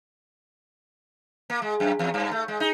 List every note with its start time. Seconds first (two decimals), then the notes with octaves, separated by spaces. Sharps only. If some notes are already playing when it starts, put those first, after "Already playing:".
1.50 A#3
1.62 G#3
1.80 F#2
1.99 E2
2.14 G2
2.31 A3
2.48 G#3
2.60 D#4